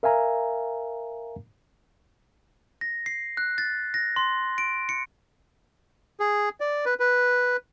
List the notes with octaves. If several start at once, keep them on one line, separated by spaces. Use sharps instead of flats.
A#4 E5 F5 G#5 A#5
A#6
C7
F#6
A6
A#6
C6
D7
C#7
G#4
D5
B4
B4